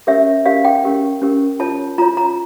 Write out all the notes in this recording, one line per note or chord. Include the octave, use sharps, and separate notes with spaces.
C#4 G4 A#4 C#5 E5
C#4 G4 A#4 C#5 F5
G5
C#4 G4 A#4
C#4 G4 A#4
F4 C#5 A5
F4 C#5 A#5
A#5